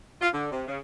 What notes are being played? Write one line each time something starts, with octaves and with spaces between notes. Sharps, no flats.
F4
D3
C3
C#3